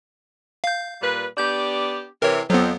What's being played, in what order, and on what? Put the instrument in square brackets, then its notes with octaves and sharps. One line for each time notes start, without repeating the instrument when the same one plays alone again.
[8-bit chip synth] F5 G6
[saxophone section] A#2 G3 B4
[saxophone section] B3 D4 G4 [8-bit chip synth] G6
[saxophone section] C3 E3 [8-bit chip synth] A#4 C#5
[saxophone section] F2 [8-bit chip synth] F#3 B3